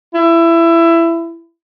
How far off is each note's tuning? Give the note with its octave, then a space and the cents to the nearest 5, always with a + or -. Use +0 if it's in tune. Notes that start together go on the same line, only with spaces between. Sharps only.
E4 +20